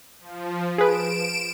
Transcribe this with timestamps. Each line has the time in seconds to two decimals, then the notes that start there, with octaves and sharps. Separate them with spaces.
0.20 F3
0.78 G#4 B4 D7 E7